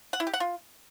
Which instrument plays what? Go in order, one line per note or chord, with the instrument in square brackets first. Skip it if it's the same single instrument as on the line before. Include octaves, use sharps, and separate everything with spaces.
[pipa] F#5
E4
G4
F#5
F4